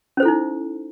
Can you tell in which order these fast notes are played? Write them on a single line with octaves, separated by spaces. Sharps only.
C#4 C5 A4 E4 D#4